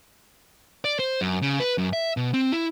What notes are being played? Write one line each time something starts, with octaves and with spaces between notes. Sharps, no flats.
D5
C5
F#2
C#3
B4
F#2
E5
B2
C4
E4